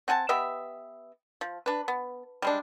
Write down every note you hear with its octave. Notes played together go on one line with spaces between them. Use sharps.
C4 F#5 G#5 A5
B3 G4 D#5 E5
F3
D4 B4
B3
G3 G#3 D4